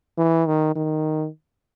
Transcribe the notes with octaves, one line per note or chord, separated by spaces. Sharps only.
E3
D#3
D#3